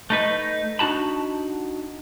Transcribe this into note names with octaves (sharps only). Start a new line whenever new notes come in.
A3 D#4 B4
D4 D#4 F#4 A5 B5